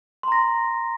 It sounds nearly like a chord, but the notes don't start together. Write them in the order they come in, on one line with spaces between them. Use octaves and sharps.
C6 A#5 A#6